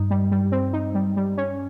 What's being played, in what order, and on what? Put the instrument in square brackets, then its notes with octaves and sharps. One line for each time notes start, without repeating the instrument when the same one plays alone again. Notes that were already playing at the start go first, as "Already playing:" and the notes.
Already playing: [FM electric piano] G2 [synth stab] D#4
[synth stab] G3
G3
C4
D#4
G3
G3
C#4